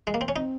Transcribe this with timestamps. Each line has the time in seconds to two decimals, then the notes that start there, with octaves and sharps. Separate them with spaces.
0.07 G#3
0.14 A#3
0.21 C4
0.28 C#4
0.36 C4 D#4